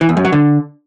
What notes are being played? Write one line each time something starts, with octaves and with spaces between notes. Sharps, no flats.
E3
E2
F#2
F#3
D3